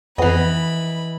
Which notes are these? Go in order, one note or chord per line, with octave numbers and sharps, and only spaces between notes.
F2 E3 B3 D#5 B5